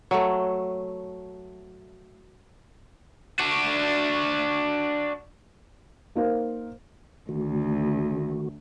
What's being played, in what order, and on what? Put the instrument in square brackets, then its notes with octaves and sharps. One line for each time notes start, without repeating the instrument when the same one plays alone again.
[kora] F#3 A3
[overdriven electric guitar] D4 F#4
[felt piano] A#3 D#4 A#4 C5 F5
[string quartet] D2 [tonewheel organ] D#3 A3 F#4